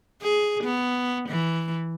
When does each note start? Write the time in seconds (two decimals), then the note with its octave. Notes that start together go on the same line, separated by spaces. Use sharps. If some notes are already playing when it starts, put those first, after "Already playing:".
0.22 G#4
0.63 B3
1.28 E3